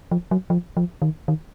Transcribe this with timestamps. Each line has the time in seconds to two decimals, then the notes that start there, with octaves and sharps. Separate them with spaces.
0.11 F3
0.31 F#3
0.50 F3
0.77 F3
1.02 D#3
1.28 D#3